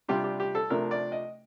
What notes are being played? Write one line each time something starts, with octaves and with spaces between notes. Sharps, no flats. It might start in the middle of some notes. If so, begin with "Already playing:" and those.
C3 G3 D4 F4 G4
G4
G4
A4
C3 F3 A3 D4 A#4
D5
D#5